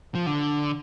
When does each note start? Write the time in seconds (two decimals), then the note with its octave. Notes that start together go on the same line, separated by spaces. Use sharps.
0.15 F3
0.26 D3